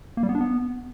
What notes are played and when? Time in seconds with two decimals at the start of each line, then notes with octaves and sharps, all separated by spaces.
0.17 A#3
0.23 G3
0.29 B3
0.35 D4
0.41 B3